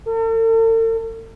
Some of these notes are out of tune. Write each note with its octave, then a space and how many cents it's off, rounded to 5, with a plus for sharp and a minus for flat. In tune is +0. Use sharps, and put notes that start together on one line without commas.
A4 +45